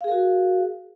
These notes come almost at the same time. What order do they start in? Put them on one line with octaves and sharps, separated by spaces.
F5 G#4 A#4 F#4